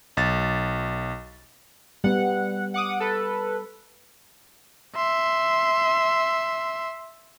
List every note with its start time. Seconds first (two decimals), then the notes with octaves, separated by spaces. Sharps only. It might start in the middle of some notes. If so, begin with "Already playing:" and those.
0.17 B1 A6
2.04 G3 B3 F#5
2.74 F#5 D6 D#6
3.00 A4 B4
4.96 E5 C6